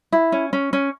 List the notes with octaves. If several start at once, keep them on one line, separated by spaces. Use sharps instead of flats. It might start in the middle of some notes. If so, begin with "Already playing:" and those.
E4
C#4
C#4
C#4